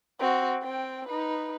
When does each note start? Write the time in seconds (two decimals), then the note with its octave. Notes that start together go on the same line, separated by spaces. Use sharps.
0.19 C4 F#4
0.63 C4 G5
1.08 D#4 B4